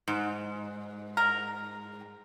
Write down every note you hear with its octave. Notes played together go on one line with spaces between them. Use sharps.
G#2
A#4